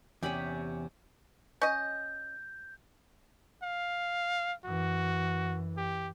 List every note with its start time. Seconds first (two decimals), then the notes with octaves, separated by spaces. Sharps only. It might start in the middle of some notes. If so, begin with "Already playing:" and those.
0.23 E2 C3 C#4 G4 B5
1.62 C#4 D#5 G6
3.63 F5
4.65 F#2 E3 F#4
5.77 G4